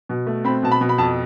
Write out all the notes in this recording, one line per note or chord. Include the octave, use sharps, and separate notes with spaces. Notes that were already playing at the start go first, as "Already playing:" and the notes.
B2
A3
C4 B5
B2 A5
B5
B2
B5
F2 A5